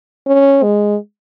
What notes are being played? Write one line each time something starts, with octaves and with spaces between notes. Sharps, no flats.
C#4
G#3